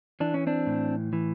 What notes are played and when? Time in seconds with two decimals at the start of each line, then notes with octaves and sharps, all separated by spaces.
0.20 E3 D4
0.34 C#4
0.47 C4 D4
0.66 A2
1.13 E3